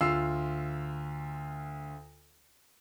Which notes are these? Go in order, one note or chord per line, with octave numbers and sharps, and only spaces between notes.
D2 F4 E6 C7